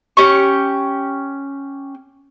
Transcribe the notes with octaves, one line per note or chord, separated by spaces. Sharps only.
C#4 G4 C#6